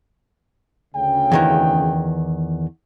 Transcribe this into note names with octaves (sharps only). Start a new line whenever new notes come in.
D2 C#3 G5
E2 D#3 E3